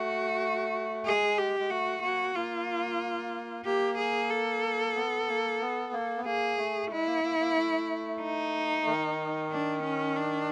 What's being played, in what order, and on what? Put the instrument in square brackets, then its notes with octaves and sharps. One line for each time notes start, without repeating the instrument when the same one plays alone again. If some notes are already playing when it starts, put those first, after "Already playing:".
Already playing: [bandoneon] A3 [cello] F#4
[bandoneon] G#3 [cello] G#4
[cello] G4
[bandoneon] G#3
[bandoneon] A3 [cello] F#4
[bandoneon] A#3 [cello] F#4
[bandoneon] A#3 [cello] F4
[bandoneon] A#3 [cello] G4
[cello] G#4
A4
[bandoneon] B3
A#3
B3
A#3
B3
[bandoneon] A#3 [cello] G#4
[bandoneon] A3
[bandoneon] G#3 [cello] E4
[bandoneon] A#3
A#3
A#3
A3
[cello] D#4
[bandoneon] D#3
[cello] D4
C#4
D4